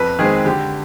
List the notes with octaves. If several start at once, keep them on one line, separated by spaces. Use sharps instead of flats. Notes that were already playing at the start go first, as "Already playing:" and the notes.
Already playing: F2 B4
D#3 G#3 C4 G#4
D3 G4